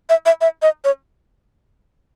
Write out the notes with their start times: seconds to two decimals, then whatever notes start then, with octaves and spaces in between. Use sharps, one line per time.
0.09 E5
0.26 E5
0.41 E5
0.62 D#5
0.84 C#5